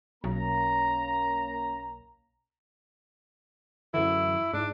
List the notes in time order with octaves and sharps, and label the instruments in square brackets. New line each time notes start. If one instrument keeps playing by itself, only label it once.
[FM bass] B1 [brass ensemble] A#3 C#4 A#5
[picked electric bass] F#2 D3 E3 [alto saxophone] E4
[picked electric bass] G#2 [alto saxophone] D4